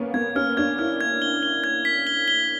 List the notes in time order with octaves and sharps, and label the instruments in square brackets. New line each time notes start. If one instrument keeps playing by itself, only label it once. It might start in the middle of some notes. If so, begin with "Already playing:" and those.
Already playing: [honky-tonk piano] A#3 B3 C#4
[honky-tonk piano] B3 [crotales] G#6
[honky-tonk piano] C#4 [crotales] F6
[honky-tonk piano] D4 [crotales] G#6
[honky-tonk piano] E4 [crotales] F6
[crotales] G#6
G7
G7
G#6
B6
G7
G7